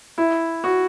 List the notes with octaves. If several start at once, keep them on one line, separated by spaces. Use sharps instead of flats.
E4
F#4